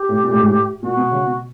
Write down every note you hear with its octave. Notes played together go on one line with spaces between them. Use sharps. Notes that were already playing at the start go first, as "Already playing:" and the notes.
Already playing: G4
A2
A#2
A2
G#2
A2
A#2 F#4
B2
C#3
B2